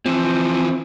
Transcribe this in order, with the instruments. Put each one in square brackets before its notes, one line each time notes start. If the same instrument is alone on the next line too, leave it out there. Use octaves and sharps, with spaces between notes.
[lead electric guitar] E3 F3 [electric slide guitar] C4